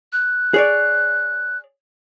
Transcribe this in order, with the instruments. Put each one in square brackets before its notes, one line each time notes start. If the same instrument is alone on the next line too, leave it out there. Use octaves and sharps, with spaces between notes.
[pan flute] F#6
[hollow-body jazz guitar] G#4 C#5 D5